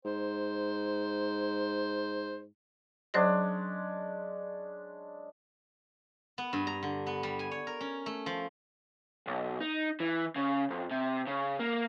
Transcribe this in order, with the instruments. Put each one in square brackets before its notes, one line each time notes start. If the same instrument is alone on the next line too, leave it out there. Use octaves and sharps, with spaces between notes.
[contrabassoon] G#2 [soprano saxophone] C5
[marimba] F#3 C5 A#6 [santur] G#3 C#4 D4
[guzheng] B3
G2
A#5
D3
B3
G3
G#5
C#5
A#4
C#4
A3
F3
[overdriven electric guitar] B1
D#4
E3
C#3
F2
C3
C#3
A#3